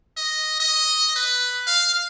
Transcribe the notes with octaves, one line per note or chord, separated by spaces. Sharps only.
D#5
D#5
B4
F5